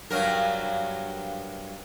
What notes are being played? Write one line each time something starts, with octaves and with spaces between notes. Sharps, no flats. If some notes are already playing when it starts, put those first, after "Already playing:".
G2 F#3 A#4